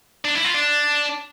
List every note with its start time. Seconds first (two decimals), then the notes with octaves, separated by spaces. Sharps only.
0.25 D4
0.35 E4
0.45 F4
0.54 D4